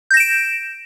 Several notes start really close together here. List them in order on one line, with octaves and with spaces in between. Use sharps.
G6 A#6 E7 D7